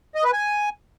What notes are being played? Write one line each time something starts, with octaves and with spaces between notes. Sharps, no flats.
D#5
B4
G#5